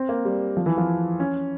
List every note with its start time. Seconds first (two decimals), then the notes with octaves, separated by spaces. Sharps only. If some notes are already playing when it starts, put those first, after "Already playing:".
Already playing: C4
0.09 A#3
0.25 G3
0.57 F3
0.66 E3
0.77 F3
1.20 C#4